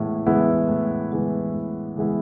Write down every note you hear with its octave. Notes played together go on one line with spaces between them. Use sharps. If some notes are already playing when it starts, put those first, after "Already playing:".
Already playing: A2 E3 G#3 B3 E4
E3 G#3 B3 E4
A2
E3 G#3 B3 E4
A2
E3 G#3 B3 E4